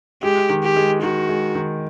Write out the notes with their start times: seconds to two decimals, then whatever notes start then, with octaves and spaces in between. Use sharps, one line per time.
0.23 G#3 G4
0.49 D#3
0.63 G4
0.76 G#3
1.02 D#3 F#4
1.29 G#3
1.55 D#3